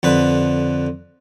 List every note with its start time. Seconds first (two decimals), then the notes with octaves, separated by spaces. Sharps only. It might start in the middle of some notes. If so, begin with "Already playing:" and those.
0.03 F2 D3 B4